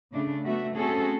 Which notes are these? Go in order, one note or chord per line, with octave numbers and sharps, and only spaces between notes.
C#3 A3 D4
F#3 A3 B3 F#4 E5
A3 C4 C#4 F#4 G#4 A4